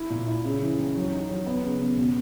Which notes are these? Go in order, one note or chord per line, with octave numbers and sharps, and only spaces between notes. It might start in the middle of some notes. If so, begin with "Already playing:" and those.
Already playing: E4
A#2
E4
C#3
E3
D#2
F#3
D#4
F#3
B3
C#3
E2
B2